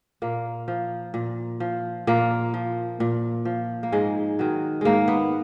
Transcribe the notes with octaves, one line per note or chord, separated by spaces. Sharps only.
A#2 A#3
F3
A#2
F3
A#2 A#3
F3
A#2
F3
A#3
G#2 G#3
D#3 F#3
G#2 G#3 A#3
B3